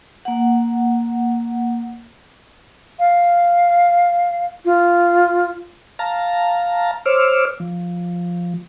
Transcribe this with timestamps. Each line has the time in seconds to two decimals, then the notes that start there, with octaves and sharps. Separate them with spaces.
0.25 A#3 F#5
2.99 F5
4.65 F4
5.99 F5 A5 A#5
7.06 C5 C#5 D6 E6 F6
7.60 F3